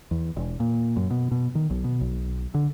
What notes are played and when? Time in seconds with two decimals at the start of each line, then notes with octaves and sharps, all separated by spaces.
0.11 E2
0.36 E1
0.60 A#2
0.96 F#2
1.11 B2
1.31 B2
1.55 D#3
1.70 B1
1.84 B2
2.01 B1
2.54 D3